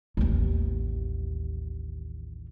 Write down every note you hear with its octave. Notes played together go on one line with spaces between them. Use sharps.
A1 D#2